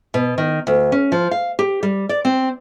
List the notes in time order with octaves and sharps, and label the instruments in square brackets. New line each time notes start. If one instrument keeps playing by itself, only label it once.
[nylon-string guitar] B2
D#3
D2
C#4
F3
F5
G4
G3
D5
C4